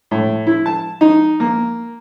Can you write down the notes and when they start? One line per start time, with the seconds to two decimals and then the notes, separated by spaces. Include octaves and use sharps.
0.11 A2
0.47 E4
0.66 A5
1.01 D#4
1.40 A#3